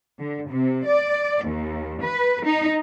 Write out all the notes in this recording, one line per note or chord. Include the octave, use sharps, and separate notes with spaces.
D3
C3
D5
D#2
B4
D#4